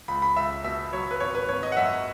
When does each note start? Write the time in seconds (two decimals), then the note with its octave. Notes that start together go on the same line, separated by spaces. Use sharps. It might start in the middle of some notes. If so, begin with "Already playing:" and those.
0.08 C#2 B5
0.22 B5
0.36 C#2 E5
0.64 B2 E5
0.93 F#3 C#5
1.11 B4
1.20 G#1 C#5
1.35 B4
1.49 G#1 C#5
1.63 D#5
1.72 F#5
1.77 F#2 E5